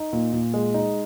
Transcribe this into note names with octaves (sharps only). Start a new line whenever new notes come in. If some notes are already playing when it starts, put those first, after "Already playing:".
Already playing: D#4
A#2
A#2
G#3
D#4